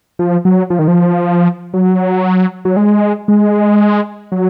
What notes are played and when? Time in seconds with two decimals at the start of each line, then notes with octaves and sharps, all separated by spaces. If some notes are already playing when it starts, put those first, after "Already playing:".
0.19 F3
0.45 F#3
0.70 F3
0.79 D#3
0.88 F3
1.74 F#3
2.65 F#3
2.77 G#3
3.28 G#3
4.32 F#3